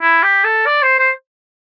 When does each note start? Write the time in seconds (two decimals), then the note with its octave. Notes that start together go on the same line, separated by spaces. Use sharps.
0.01 E4
0.23 G4
0.44 A4
0.66 D5
0.82 C5
0.99 C5